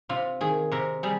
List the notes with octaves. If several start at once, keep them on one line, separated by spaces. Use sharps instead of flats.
C3 F4
D#3 G#4
C3 A#4
G3 G#4